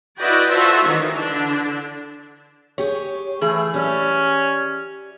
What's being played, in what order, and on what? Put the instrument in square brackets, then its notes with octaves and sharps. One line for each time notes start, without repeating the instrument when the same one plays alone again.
[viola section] E4 F#4 B4 D5 D#5 G5
F4 F#4 A4 C5 E5
D#3 E3 D#4
D3 D4
[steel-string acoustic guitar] G4 G#4 [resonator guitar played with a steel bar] C#5
[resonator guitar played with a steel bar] E3 G#4 [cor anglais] A3
[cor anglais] C#4 [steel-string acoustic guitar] G4 D5 E5